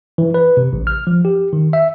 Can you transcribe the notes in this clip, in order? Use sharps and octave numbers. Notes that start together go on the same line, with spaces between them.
E3
B4
C3
A1
F6
F3
G4
D#3
E5